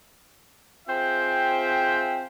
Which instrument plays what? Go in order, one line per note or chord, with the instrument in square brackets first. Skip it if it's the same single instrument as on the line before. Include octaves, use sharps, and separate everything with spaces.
[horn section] C4 F4 G#4 C5 E5 G5